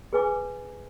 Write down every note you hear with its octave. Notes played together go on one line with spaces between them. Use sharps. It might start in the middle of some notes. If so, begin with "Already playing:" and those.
G#4 B4 G#5 D6